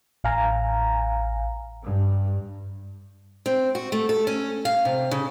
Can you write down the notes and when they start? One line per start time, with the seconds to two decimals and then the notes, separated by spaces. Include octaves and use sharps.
0.24 A1 F5 G#5 A#5
1.84 G2
3.46 C4
3.75 F#4
3.92 A3
4.09 A4
4.27 C#4
4.65 F5
4.85 C3
5.11 C#3